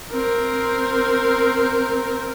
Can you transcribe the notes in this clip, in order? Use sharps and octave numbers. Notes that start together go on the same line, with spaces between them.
C4 A#4